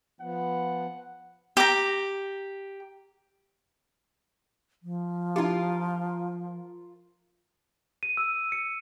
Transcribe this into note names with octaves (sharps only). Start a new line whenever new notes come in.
F3 B3 F#5
G4 A#5
F3
D4 E4 F4 G4 A#4
D#7
E6
C#7